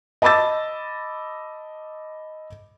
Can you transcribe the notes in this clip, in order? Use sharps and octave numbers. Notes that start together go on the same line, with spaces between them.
D#5 A5 B5 D6 E6 A6